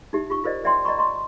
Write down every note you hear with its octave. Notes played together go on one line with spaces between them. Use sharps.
D#4 E4 G4 E5
F4 G4 C#6
F4 A#4 C5 D5 D#5
C#5 D5 E5 G5 A5 C6
D5 D#5 A#5 B5 C#6
D#5 A#5 C6 C#6